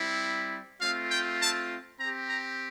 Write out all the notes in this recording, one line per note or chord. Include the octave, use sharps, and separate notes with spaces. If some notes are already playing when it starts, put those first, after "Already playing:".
Already playing: G3 C4 E4
A3 C4 F4 F5
G5
A5
C4 G4 A#5
A#5